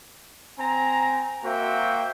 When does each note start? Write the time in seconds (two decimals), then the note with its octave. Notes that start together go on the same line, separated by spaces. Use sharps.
0.58 C4 G#5 A#5
1.44 A#3 F#4 C5 E5 G5